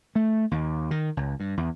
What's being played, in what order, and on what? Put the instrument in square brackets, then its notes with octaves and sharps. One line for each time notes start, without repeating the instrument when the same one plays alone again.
[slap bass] A3
D#2
D#3
C#2
G2
E2